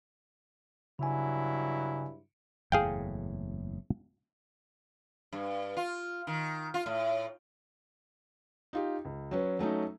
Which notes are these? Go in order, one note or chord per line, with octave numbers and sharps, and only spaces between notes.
G2 C#3 F#3 E4 G#5
F#1 E2 A2 G#4 F5 G5
G2
F4
D#3
F4
A2
D#4 F4 G4
C#2
F#3 C#4 B4
F#3 A3 C#4 D#4